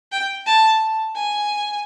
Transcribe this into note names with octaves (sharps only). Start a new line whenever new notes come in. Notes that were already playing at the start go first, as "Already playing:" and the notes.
G5
A5
G#5